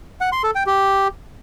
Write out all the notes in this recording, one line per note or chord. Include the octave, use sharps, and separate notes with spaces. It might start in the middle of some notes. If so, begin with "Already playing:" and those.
F#5
C6
A4
G5
G4